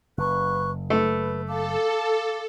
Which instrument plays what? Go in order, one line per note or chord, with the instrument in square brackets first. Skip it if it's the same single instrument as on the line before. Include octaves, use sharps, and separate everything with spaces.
[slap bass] F#1 [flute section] B4 C#6 F#6
[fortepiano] A3 [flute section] B4
[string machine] A4 [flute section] F5 A5 D6